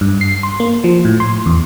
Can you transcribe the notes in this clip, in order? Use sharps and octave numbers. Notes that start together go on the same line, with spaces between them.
G2
C7
C6
A#3
F3
A2
C6
E2